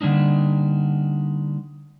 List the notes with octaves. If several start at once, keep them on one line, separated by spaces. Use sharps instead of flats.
D3 G3 A#3 D4 D#4